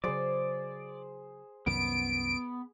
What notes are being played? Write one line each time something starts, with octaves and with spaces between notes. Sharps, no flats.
C#3 F#3 G#4 C5 D5
C2 F#2 D#3 B3 D7